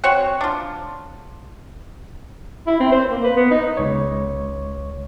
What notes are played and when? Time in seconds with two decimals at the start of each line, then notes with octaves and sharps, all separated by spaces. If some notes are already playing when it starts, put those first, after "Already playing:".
0.04 C4 F#4 C#5 C#6
0.41 D4 F4
2.67 E4
2.80 C4
2.92 C5
3.11 A#3
3.24 B4
3.36 B3
3.51 D#4
3.77 C#2 C#5